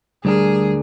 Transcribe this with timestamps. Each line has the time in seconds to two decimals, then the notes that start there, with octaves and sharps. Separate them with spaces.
0.25 D2 G3 D4 G#4 A#4